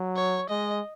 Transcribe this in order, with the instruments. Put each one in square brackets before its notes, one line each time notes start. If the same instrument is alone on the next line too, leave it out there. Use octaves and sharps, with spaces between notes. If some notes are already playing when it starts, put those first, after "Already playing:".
Already playing: [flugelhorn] F#3
[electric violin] C#5
[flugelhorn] G#3 [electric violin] D#5